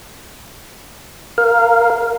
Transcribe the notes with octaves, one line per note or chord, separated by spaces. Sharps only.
A#4 F5